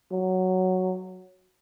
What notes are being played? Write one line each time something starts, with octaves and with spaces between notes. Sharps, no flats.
F#3